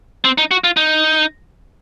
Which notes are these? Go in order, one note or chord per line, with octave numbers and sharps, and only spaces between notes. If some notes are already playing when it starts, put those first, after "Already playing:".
C4
D#4
F#4
F4
D#4